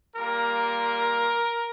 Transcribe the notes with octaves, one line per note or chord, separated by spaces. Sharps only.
G3 A#3 F4 A#4